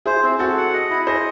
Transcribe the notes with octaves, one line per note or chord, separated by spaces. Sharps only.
E4 G#4 C5
C4
C4 F#4 A4
F#5
D#5
E4
G#4 C5 D#5